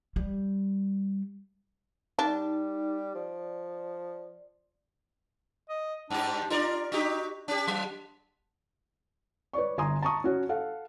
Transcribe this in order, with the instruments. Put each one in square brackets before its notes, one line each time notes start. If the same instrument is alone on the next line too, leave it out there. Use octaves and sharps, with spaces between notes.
[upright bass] G3
[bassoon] G3 [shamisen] D4 [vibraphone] D#4
[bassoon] F3 [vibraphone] D5
[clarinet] D#5
[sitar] G2 G4 [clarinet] D4
[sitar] D4 A#4 D5 [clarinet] F4
[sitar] D4 D#4 G4 [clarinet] F#4
[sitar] C#4 G4 [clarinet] D4
[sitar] F#3
[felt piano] B4 C#5 D5 C#6
G1 G#5 A#5 C6 D#6
A5 A#5 C#6 D#6
C#4 F#4 C#5
A4 F5 F#5